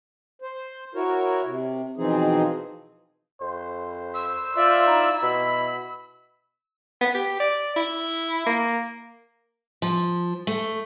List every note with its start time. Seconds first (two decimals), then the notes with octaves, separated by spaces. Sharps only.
0.42 C5
0.95 E4 F#4 A#4 C#5
1.45 C3
1.97 B2 E3 F3 C4 D#4 G#4
3.41 F2 C5
4.14 E6
4.57 F4 D5 E5
4.87 D#4 E4
5.22 B2 B5
7.01 B3
7.15 G4
7.40 D5
7.76 E4
8.47 A#3
9.82 F3
10.47 A3